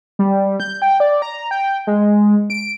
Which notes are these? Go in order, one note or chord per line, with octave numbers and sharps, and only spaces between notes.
G3
G6
G5
D5
A#5
G5
G#3
D7